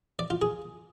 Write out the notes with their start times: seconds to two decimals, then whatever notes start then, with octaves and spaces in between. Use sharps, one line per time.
0.19 D5
0.30 F4
0.42 G#4